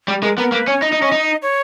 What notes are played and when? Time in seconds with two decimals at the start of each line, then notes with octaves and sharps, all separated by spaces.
0.08 G3
0.23 G#3 A#4
0.38 B3 A#4
0.52 A#3 B4
0.68 C#4 C#5
0.82 D#4 D#5
0.93 D#4
1.02 C#4
1.12 D#4
1.42 C#5